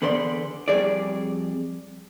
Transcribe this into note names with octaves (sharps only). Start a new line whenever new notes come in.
E2 D3 B3 B4 D5 C6
F2 G3 G#4 C#5 D5